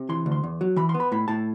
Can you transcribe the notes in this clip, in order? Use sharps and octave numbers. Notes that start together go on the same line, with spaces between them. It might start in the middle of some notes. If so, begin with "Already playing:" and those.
Already playing: C3
E3 C6
D2
C6
E2
F#3
E3 B5
C6
B3
B5
A2 B5
A2 A5